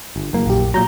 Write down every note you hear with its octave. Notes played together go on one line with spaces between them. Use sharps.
G1
F#1 F#2 A#3
A#1 G4
A#2 F#3 A#5 G6